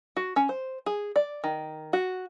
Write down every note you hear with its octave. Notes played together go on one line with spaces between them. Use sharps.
F#4
C#4
C5
G#4
D5
D#3
F#4